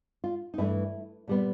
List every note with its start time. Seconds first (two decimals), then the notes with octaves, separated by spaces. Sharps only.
0.24 F4
0.54 D#4
0.58 G2 E3 A3 E4
1.28 A#2 G3 B3